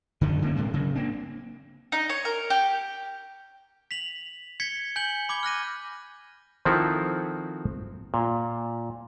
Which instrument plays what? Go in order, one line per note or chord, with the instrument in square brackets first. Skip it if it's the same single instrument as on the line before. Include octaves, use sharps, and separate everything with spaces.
[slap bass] F#2 D3 D#3 F3
D3 A#3 C#4
A2 C3 G#3 A#3
C#3 F#3
A#3 C4 D4
[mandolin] D#4
C#5
A#4
G4
[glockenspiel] B6 F7 F#7
G#6 B6 C#7 G7
G#5 G6 C#7 F#7 G7
B5 D6 G#6 G7
F6 F#6 A#6 D#7
[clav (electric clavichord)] D#3 F3 C4 E4 F#4 A4
A#2